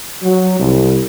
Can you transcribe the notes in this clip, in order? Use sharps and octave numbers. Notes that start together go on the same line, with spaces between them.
F#3
C2